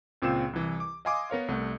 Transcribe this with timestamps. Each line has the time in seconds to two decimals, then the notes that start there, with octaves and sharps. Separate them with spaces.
0.22 C#2 A#2 C4 G5 C7 E7
0.53 C2 E3
0.80 D6
1.05 D#5 F5 G#5 C6 D6 D#6
1.30 B3 A#4 C#5 F5
1.48 C2 A3 F#5